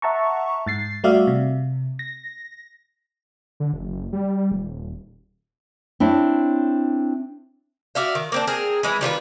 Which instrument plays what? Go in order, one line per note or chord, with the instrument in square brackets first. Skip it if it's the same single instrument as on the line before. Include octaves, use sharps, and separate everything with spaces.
[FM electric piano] E5 F#5 A5 A#5 C#6
G#2 A6 C7
G3 A3 F#4 D5 E5 F5
C3
A#6
[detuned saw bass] D3
F#1
G3
D#1
[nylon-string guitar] C4 D4 E4 C#5
[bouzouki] F#4 D5 E5 F5
D#3
A#3 C4 D4
C4 G#4 A#4
E3 G#3 E4
D#3 G3 F4 B4